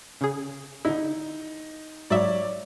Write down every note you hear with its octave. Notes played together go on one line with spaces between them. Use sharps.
C#3 G#4
D3 D#4 E4
G#2 F#3 C#5 D5 E5